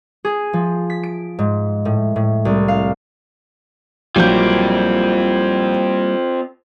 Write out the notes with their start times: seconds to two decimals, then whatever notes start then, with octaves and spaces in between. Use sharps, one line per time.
0.25 G#4
0.53 F3
0.90 B6
1.03 D7
1.39 G#2
1.85 A2
2.16 A2
2.45 C2
2.68 F5
4.16 A#1 F#3 G3 A#3 C4 E4 F4 G6